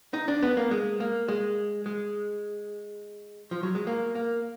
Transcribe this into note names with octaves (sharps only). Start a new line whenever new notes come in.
D#4
D4
B3
A#3
G#3
A#3
G#3
G#3
F3
F#3
G#3
A#3
A#3